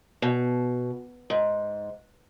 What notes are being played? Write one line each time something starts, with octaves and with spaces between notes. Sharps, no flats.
B2
G#2